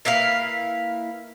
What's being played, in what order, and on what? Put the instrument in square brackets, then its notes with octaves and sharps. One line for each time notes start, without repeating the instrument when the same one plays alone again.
[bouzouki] A#3 E4 B4 F5